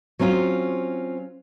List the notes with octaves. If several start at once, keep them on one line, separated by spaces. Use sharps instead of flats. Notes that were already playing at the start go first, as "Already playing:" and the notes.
F#3 C4 C#4 F4